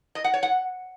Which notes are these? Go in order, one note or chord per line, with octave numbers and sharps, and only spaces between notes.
D#5
F#5
C#5
F#5